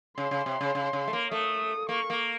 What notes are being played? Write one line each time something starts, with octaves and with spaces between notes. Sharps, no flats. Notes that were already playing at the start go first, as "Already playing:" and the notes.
C#3 C6
C#3
C3
C#3
C#3
C#3
A3
A#3
A3 D#6
A#3 C#6
A#3